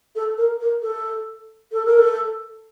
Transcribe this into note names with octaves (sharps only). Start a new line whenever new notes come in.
A4
A#4
A#4
A4
A4
A#4
A4